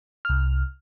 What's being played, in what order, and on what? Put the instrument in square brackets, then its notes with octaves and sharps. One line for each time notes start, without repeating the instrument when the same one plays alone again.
[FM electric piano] C2 F6